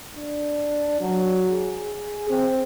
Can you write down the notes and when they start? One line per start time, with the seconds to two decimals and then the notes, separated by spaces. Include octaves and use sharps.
0.16 D4
1.01 F#3
1.51 G#4
2.30 C4